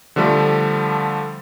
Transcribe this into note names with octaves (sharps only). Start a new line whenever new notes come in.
D3 F3 G3 A3